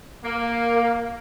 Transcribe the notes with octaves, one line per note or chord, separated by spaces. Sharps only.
A#3